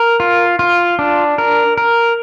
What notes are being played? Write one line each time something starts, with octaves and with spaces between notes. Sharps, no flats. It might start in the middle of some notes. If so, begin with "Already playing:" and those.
Already playing: A#4
F4
F4
D4
A#4
A#4